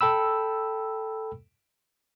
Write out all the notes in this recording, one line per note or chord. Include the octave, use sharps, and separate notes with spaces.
A4 G5 B5 E6